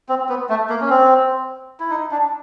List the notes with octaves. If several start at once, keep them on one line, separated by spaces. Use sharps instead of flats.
C4
B3
A3
A#3
C#4
C4
E4
D#4
D4